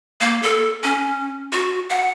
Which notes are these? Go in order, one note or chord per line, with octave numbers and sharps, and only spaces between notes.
A#3
A4
C#4
F#4
F#5